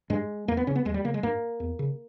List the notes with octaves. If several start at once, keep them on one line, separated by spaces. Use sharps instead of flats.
G2 G#3
E2 A#3
B3
C#3 C#4
B3
D#2 G#3
G3
C#3 A#3
G#3
G2 A#3
E2
C#3